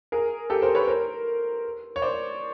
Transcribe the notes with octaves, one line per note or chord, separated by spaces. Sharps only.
G#4 A#4
G4 A4
A#4 C5
B4 C#5
A#4 C5
C#5
C5 D5